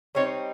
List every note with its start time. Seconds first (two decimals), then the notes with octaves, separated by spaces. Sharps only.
0.15 G3 C4 D#4 C#5